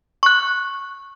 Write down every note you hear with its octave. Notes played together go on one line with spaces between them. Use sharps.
C#6 F#6